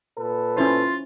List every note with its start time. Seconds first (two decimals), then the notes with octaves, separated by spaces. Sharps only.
0.17 A#2 A4 B4
0.57 C#4 E4 F4 C5